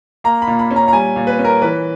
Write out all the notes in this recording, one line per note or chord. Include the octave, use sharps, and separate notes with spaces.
A#3 A#5
B5
A#2
B5
C#4
A#5
A#5
G3 G#5
A#2
B4
C#4
A#4
E3 B4